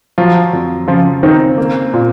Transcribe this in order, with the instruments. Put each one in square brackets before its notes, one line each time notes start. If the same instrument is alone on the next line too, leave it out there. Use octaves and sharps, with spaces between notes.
[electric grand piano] F3 F4 [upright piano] F#3
[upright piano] F2
[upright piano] C#3 [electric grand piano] F3 F4
[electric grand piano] D#3 D#4 [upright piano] C4
[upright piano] A#3
A#2